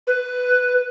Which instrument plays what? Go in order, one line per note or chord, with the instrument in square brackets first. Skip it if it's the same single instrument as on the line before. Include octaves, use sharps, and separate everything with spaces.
[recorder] B4